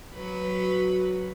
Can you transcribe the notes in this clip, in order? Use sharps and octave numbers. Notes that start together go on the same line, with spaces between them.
F#3 F#4 B4